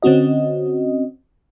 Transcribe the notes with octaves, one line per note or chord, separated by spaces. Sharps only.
D3 C4 C#4 F#4 D#5